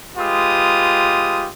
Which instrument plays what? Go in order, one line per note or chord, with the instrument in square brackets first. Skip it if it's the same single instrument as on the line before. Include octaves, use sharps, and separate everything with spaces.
[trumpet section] G#3 F4 G4 B4 D#6